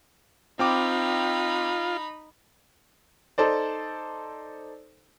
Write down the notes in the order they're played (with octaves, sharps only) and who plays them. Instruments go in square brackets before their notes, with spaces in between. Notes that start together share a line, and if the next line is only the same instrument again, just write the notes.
[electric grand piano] C4 G5 D6 [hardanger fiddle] D#4 B5 [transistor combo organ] F4
[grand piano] D#4 A4 C5 D5